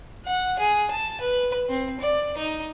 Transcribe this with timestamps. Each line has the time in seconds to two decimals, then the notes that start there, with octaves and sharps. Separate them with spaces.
0.25 F#5
0.59 G#4
0.90 A5
1.20 B4
1.69 C4
2.00 D5
2.37 D#4